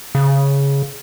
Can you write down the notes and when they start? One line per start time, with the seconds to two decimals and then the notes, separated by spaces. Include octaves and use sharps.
0.15 C#3